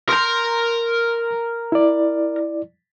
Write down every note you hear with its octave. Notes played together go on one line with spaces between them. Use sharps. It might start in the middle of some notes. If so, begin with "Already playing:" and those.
A#4 A#5 C6 G6
E4 D5